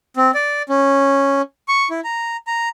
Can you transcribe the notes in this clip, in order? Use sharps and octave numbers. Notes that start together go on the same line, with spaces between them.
C4
D5
C#4
C#6
E4
A#5
A#5